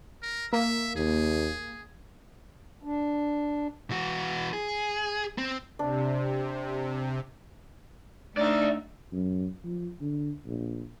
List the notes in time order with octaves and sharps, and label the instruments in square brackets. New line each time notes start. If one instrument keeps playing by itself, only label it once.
[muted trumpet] A#4
[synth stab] A#3 [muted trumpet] E5
[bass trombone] D#2 [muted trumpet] G#4
[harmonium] D4
[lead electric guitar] E3 F#4
G#4
C4
[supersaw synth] C3 [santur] D4
[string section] A3 D4 D#4 [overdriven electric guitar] D5 E5
[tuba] F#2
F3
D3
A#1